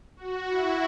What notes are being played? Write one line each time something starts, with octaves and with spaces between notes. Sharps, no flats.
F#4
E4